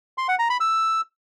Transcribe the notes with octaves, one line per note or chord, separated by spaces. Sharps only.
C6
F#5
A#5
B5
E6